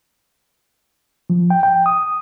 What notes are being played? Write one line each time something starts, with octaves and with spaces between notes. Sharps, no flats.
F3
G5
G5
D#6